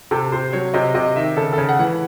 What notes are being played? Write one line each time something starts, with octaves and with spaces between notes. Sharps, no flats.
C3 A4
C3 C5
F#3 C#5
C3 D#5
C3 D#5
D#3 E5
C#3 A4
A4
C#3
F#5
E3